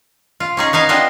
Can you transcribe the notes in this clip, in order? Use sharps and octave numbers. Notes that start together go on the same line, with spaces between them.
F4
C#4 D#4 G#4
B3 D#4 F5 G#5
B3 C4 D4 F4 C5 D#5